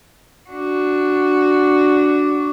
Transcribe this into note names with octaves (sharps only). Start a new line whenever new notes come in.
D4 F#4